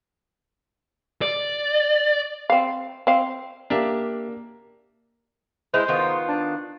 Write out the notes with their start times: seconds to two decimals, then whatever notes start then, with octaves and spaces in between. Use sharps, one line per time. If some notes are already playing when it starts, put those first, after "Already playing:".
1.22 D5
2.50 C4 F5
3.07 C4 F5
3.70 A#3 D4 G4 E5
5.74 G#3 E4 C5
5.88 D#3 B3 F4
6.28 D4